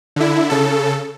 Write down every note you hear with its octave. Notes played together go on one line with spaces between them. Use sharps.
D3 E4
C#3 A4